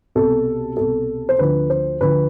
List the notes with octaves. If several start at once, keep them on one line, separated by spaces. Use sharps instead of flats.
C2 B2 A4
C2 B2 A4
C5
D2 D3 F3 B4
C5
D2 D3 F3 B4